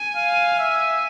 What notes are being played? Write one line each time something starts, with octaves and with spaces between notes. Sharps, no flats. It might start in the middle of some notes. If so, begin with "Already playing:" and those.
Already playing: G#5
F5
E5